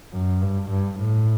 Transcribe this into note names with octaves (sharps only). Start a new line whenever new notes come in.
F#2
G2
G2
A2